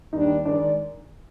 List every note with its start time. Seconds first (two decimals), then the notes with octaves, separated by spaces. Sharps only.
0.13 D#2 D#3 G3 D4 D#4
0.45 D#3 G#3 D4 D#4 A#4 D5